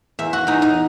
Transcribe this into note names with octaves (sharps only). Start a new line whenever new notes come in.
E2 E5
F#4
E2 D#4
D#4